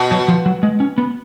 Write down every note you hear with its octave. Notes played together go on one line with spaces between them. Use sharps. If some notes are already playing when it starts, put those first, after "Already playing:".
Already playing: B2
F#3
F3
F#3
G#3
C#4
B3